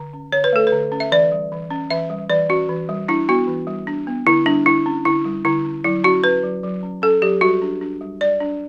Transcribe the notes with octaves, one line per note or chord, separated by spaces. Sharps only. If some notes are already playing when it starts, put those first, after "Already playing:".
Already playing: D3
C#4
D3 C#5
B4
A3 A4
B4
D3
C#4
E5
E3 D5
G3
E3
C#4
E3 E5
G3
E3 D5
C#4 F#4
E3
G3
D4 E4
B3 F#4
E3
G3
D4
B3
D3 E4
G3 D4
D3 E4
C#4
D3 E4
G3
D3 E4
C#4
F#3 E4
C#4 F#4
C#4 B4
F#3
F#3
C#4
C#4 A4
F#3 G4
G3 F#4
D4
D4
G3
G3 D5
D4